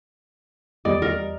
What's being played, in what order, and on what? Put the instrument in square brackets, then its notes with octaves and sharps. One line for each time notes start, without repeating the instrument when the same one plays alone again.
[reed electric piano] E2 G3 D#5 [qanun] D5
[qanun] A#4